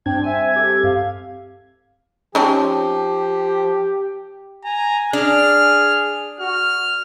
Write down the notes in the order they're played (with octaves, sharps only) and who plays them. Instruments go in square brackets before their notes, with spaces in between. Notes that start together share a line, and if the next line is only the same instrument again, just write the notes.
[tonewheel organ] G2 G#6 [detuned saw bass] C4 [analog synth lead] D4 [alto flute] G5
[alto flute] E5 [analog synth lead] G#5
[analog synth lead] G4 [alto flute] A4
[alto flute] F5
[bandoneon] F3 [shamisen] C4 C#4 D#4 [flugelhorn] G4 [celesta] A5
[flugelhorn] G#5 [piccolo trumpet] A#5
[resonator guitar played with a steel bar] D4 [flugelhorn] G#4 [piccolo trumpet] F6
[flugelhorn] F#4 [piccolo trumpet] F6